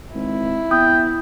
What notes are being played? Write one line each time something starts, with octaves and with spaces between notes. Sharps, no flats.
G#1 E4
E2 G5 D#6